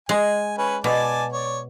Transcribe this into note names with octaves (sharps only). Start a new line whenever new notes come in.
G#3 G#5
C#4 B4 G#5
B2 D5 G#5 A5
C#5 D5